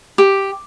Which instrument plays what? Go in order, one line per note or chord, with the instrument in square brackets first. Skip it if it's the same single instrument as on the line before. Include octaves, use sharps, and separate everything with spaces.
[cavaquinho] G4